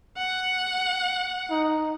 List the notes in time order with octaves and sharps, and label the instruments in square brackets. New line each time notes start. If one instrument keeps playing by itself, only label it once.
[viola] F#5
[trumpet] D#4